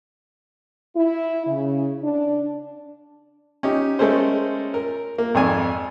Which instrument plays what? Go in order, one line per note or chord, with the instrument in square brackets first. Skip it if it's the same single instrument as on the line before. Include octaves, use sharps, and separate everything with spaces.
[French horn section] E4
C#3
D4
[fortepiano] C#4 D#4 G4
G#3 A3 C#4 A4 A#4 C5
A#4
A#3
G#1 F2 D5 G#5